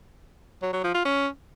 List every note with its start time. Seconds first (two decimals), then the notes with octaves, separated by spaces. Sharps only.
0.62 F#3
0.73 F#3
0.84 F3
0.95 F4
1.05 C#4